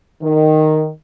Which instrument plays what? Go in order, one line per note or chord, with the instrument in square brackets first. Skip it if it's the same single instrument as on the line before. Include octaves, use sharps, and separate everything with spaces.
[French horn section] D#3